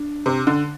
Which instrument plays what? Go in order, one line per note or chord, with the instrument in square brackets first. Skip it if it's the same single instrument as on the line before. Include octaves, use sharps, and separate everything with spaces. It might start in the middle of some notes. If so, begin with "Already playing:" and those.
Already playing: [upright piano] D4
[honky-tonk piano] C3
D3